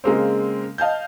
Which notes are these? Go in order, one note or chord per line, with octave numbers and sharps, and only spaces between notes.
C#3 G#3 A#3 C4
D#5 F5 A5 G6